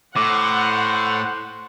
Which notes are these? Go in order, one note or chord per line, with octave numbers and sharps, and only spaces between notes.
A2 C5 F#5 D6